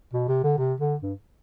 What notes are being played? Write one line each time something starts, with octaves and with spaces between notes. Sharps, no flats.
B2
C3
D3
C3
D3
G2